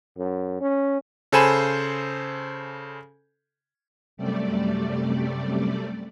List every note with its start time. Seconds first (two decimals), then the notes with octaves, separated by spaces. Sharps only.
0.18 F#2
0.61 C#4
1.32 C#3 A4 C5 G#5 B5 E7
4.17 F#2 C3 G3 A3 D5